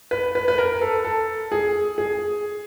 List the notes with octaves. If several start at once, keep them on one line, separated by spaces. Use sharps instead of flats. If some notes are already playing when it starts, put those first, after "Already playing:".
B4
B4
B4
A#4
A4
A4
G#4
G#4